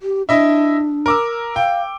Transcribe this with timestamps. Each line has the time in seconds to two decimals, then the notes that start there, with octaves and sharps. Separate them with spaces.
0.01 G4
0.29 D4 E4 D#5 E5
1.06 A#4 D6 E6
1.56 F5 G5